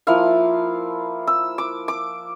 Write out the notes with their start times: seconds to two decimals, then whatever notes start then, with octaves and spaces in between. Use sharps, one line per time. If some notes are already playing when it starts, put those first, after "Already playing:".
0.07 F3 A#3 E4 F5
1.27 E6
1.58 D6
1.88 D6